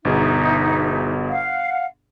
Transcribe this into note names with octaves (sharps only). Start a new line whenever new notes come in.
G1 B2 D#4 G#4 E5
F5 F#5